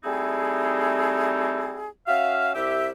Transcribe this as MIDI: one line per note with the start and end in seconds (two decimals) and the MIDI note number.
0.04 1.89 55
0.04 1.89 57
0.04 1.89 60
0.04 1.89 63
0.04 1.89 64
0.04 1.89 68
2.07 2.52 61
2.07 2.52 66
2.07 2.52 76
2.07 2.52 77
2.55 2.89 36
2.55 2.89 67
2.55 2.89 76